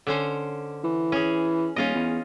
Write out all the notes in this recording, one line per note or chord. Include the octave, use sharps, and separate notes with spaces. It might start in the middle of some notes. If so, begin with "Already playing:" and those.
D3 C#4 C5
E3
C#4 G#4
D#1 C#4 F4 D#5
E2